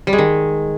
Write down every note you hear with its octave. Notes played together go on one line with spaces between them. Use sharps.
G3
G#3
D#3